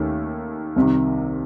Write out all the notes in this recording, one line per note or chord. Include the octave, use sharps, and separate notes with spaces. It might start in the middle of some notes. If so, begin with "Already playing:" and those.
Already playing: D#2 D#3 A3 C#4
C2 C3 D#3